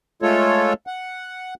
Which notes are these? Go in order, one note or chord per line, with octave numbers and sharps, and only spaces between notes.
G#3 A3 F4 A4 C#5
F#5